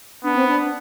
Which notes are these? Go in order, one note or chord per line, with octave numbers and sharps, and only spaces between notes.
B3 D4
C4
D4